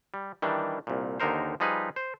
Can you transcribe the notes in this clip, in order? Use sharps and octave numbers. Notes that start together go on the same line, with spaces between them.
G3
D#3 E3 G3 D4
C2 A#2
D#2 D3 D#4 A#4 C5
F3 G3 D#4 G#4 B4
C5